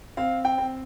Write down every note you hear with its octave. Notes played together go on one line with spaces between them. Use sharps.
C4 F5
G5
C4